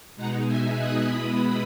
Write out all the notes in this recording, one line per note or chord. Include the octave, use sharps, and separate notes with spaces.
B2 G#3 D#4 F#5 A#5
E5 G#5
D#6 F#6
B2 G#3 B3 E4 B5 D#6